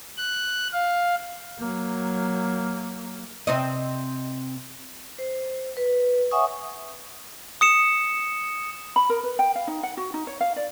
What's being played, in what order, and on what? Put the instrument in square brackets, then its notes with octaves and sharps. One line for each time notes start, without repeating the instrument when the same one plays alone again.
[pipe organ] F#6
F5
[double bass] F#3 A#3
[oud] C3 C4 D#5
[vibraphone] C5
B4
C#5 E5 F#5 G#5 C#6 D#6
[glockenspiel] D#6 C#7 E7
[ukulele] B5
A#4
B4
G5
F5
D#4
F#5
F#4
D#4
C#5
F5
D5